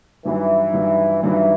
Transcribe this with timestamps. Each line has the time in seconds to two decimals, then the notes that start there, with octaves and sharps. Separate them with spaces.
0.24 G2 D#3 E3 F#3
0.74 G2 D#3 F#3
1.23 G2 D#3 E3 F#3